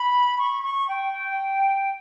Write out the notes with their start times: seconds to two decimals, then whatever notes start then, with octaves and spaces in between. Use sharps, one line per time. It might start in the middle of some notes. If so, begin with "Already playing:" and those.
Already playing: B5
0.38 C#6
0.63 C#6
0.88 G5